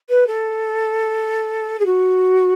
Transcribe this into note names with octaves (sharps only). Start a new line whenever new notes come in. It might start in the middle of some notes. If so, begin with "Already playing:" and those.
B4
A4
G#4
F#4